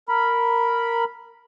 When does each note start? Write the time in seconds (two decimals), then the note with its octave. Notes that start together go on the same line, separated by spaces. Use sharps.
0.09 A#4 B5